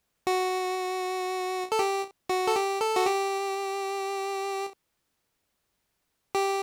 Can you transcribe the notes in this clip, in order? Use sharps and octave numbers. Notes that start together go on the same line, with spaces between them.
F#4
A4
G4
F#4
A4
G4
A4
F#4
G4
G4